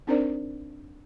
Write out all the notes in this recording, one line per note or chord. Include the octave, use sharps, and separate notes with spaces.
C4 D4 D#4 A#4 C5 D5